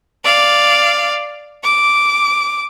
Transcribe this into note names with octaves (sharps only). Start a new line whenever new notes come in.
D5 F5
D6